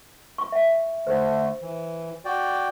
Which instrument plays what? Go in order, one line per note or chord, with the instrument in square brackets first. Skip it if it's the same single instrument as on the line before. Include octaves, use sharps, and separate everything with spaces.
[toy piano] C#6
E5
[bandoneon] D3 A3 [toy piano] C5
[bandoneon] E3
F#4 D5 G5